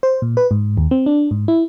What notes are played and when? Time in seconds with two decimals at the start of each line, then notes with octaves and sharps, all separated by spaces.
0.03 C5
0.22 A#2
0.37 B4
0.51 G#2
0.77 D#2
0.91 C4
1.06 D4
1.31 G#2
1.48 E4